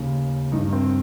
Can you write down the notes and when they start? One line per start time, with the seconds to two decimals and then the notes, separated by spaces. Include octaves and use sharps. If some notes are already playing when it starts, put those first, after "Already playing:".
Already playing: D#2 C#3
0.52 G2 D#3 D#4
0.73 C4